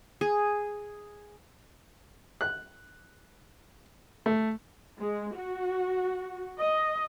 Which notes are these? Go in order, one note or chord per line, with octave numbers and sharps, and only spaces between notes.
G#4
F#6
A3
G#3
F#4
D#5